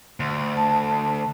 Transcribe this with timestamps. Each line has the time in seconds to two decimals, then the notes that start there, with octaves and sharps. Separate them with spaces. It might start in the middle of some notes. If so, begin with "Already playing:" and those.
0.20 D2
0.57 A5